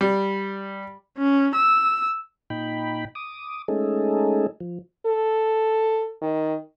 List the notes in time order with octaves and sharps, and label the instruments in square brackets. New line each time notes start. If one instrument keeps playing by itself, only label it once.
[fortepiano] G3
[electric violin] C#4
E6
[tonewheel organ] A#2 D#4 G5 B5
D6 D#6
G#3 A3 C#4 D#4 G#4 A4
F3
[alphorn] A4
D#3